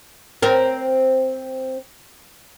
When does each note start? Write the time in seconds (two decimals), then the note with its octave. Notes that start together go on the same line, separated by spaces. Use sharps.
0.42 C4 A#4